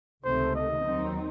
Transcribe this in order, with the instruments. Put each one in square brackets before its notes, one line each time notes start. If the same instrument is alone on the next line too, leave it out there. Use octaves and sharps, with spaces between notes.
[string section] C#2 C3 D#3 A3 [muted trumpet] C5
[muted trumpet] D#5
[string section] D#2 D#3 F#3 C4 D#4